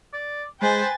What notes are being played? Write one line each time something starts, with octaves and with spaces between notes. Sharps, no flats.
D5
G#3 B4 C5 G5 G#5 A6